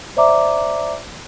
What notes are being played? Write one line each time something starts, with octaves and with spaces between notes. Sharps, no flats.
C5 D5 E5 A#5 D6